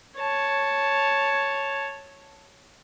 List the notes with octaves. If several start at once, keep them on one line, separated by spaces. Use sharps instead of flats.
C#5 A5